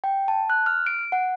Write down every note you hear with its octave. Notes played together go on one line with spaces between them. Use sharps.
G5
A5
F#6
F6
D7
F#5